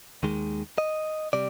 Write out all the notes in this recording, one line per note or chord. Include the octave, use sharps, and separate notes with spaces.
D#2 D#3 G#3
D#5
C3 G3 D5